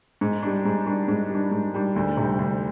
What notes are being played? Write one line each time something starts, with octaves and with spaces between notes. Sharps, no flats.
G#2
G3 D4
G#2
G3 D4
G#2
G3 D4
G#2
G3 D4
D2
C3 G3
D2